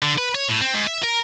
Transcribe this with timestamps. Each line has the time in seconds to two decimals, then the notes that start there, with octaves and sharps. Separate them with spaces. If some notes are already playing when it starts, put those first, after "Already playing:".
0.02 D3
0.18 B4
0.35 C#5
0.49 A2
0.61 C4
0.74 G#2
0.87 E5
1.03 A#4